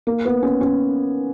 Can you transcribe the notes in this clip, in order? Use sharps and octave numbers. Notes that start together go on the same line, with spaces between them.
A#3
B3
C#4
C#4